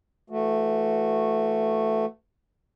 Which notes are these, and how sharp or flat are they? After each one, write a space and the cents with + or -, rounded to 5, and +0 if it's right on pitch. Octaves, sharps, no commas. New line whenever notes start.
E3 +20 A3 +5 F#4 -15